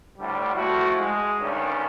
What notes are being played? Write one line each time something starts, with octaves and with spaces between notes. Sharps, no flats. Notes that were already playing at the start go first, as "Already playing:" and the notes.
D2 A2 D3 G3
F3 A3 E4 F#4
G#3
D2 G2 D#3 G3 C#4